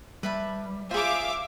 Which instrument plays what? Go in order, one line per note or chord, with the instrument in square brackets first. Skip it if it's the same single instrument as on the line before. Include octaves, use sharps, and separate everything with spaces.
[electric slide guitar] G3 [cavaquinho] B4 E5 A5
[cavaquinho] F4 G#4 [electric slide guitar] C5 [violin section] E5 F5 D6